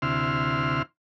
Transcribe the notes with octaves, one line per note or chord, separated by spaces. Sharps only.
D2 C3 E4 C6 F6